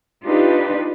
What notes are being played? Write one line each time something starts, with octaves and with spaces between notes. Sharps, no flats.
D4 D#4 F4 G4 B4